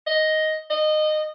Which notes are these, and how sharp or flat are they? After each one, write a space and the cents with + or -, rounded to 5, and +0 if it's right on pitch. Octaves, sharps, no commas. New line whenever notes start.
D#5 +5
D#5 -20